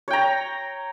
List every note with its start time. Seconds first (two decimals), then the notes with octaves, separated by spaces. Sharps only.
0.08 C#5
0.10 G5
0.13 A#5